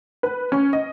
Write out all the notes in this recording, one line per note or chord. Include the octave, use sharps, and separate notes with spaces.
B4
C#4
D#5